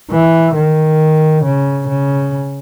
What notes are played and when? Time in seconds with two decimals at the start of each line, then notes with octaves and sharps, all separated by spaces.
0.11 E3
0.55 D#3
1.44 C#3
1.88 C#3